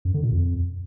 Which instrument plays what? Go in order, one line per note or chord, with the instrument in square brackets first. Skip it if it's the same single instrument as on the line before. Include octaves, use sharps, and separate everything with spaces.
[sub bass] F#2
D3
A#2
F2